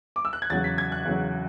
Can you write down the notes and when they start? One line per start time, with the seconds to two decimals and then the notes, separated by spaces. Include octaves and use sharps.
0.16 D6
0.25 E6
0.33 F#6
0.42 G#6
0.50 E2 C#3 F#3 A6
0.64 B6
0.78 G#6
0.92 F#6
1.05 E2 C#3 F#3